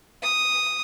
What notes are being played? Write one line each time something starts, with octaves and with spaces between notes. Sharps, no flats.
D#6